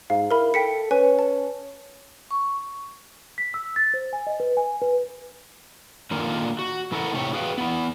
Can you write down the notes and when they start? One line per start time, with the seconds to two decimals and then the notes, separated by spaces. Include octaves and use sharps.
0.10 G#2 F5
0.31 E4 A#4 B5
0.54 A4 G5 B6 C#7
0.91 C#4 B4 G#5
1.19 A5
2.31 C#6
3.38 B6
3.54 E6
3.76 A6
3.94 C5
4.13 G#5
4.27 D#5
4.40 B4
4.57 G#5
4.82 B4
6.11 D3 D#3 A#3 F4
6.59 F#4
6.92 E3 E4 A4 A#4 D#5 F#5
7.14 A2 C3 G4 C#5
7.33 F#4 G#4 B4 F5 G5
7.58 B3 E4